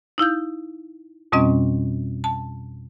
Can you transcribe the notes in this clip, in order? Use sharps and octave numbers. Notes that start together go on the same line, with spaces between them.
D#4 E4 F5 G6
F2 B2 G3 C4 C#4 D#5
A5